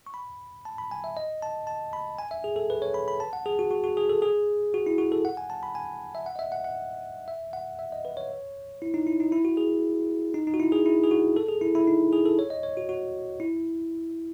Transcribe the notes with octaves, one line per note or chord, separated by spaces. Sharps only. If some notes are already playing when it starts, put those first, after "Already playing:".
C#6
B5
A5
B5
G#5
E5
D#5
A5
A5
B5
G#5
E5
G#4
A4
B4
C#5
B5
B5
A5
F#5
G#4
F#4
F#4
F#4
G#4
A4
G#4
F#4
E4
F#4
A4
F#5
G#5
A5
B5
G#5
E5
F#5
D#5
E5
F#5
F#5
E5
F#5
E5
D#5
B4
C#5
E4
D#4
E4
D#4
E4
F#4
G#4
D#4
D#4
F#4
E4
G#4
E4
G#4
F#4
A4
G#4
E4
E4
D#4
G#4
A4
C#5
D#5
C#5
F#4
F#4
E4